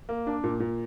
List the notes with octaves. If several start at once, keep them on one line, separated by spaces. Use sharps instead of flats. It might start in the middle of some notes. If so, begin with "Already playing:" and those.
A#3
D4
A#2
A#2